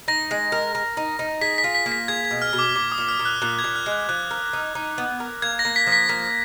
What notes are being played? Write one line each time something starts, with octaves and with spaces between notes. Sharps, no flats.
D#4 A#6
G#3
A#4
A#4
D#4
D#4
G#4 B6
B6
F4
B6
A#3
B6
G#4 G#6
G#6
B2
F6
B2
D6
A#2 D6
D#6
A#2
F6
A#2
F#6
A#2 F#6
G#6
A#2
F#6
G#3
F#6
F3 F#6
A#4
D#4
D#4
B3
A#4
A#3 G#6
A#6
A#3
B6
F3
B6
A#3 B6